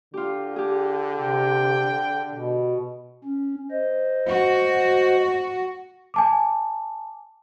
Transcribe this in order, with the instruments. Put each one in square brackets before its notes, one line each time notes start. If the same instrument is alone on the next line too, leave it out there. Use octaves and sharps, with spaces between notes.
[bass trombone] D3 [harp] F4 G4
[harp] G4 G#4
[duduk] C3 [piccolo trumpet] G5
[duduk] B2
[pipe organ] C#4
C5 D#5
[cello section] F#4
[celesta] G#5 A5 D6